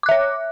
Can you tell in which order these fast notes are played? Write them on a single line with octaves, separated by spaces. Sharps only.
D6 F#6 E5 C#5